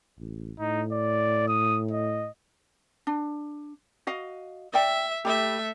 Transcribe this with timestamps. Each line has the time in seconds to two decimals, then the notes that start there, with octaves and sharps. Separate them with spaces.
0.19 A1
0.60 A2 D#4
0.92 D5
1.48 D#6
1.91 D#5
3.07 D4
4.07 F#4 D#5 F5
4.73 D5 E5 G5
5.25 A3 G4 E5 B5